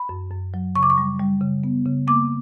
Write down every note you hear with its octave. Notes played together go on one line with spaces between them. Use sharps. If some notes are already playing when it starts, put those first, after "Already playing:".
Already playing: B5
F#2
F#2
F#3
C#3 C#6
D6
C#6
G3
G3
C#3
B3
C#3
A#3 D6